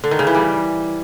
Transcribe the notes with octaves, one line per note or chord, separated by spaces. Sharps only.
D3
D#3
C#3
E3
G3